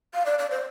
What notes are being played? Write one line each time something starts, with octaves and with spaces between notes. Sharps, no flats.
F5
D5
D5
C5